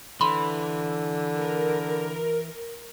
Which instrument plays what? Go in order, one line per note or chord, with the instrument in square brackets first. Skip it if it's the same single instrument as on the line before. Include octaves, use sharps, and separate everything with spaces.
[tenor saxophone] D3 [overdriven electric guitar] E3 [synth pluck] B5 C6
[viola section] A#4